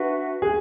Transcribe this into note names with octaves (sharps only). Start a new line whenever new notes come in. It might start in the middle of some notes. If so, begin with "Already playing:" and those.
Already playing: D4 F#4 B4 E5
G#4